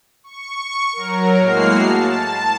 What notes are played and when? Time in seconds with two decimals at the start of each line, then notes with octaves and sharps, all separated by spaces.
0.24 C#6
0.93 F#3 A#4
1.37 A2 G#3 A#3 F#4 F6 C7
1.83 A5